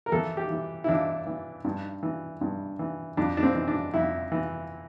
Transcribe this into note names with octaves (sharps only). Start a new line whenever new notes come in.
A#4
E2 A4
G4
E3
E4
E2 D4
E3
G2
E3
G2
E3
F2 D4
D4
C4
E3
D4
F2 E4
E3